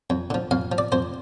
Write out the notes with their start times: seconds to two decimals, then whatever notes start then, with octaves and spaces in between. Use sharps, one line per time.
0.10 F2
0.30 D3 F3
0.51 F2 F5
0.72 F3
0.78 D5
0.92 F2 C5